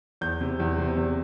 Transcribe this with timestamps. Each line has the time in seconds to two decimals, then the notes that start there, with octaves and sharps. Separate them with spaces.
0.21 E2 G6
0.41 C3
0.60 E2
0.78 C3
0.97 E2